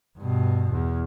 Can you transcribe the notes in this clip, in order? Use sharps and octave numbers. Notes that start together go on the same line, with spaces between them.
G2 B2
E2